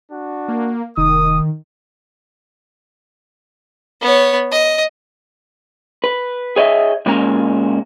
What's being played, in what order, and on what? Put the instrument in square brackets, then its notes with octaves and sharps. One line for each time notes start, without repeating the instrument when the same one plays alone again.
[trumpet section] D4 F#4
[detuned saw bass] A#3
[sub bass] F1 [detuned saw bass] D#3 [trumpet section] D#6
[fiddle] B3 C#5
D#5
[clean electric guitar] B4
G#4 C#5 D#5 E5
A#2 G#3 A#3 C#4 D5 A#5